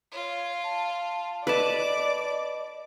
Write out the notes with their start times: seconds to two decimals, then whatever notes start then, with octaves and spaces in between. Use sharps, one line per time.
0.12 F4 C#5
0.63 A5
1.47 B4 D5 D#5 A5 D6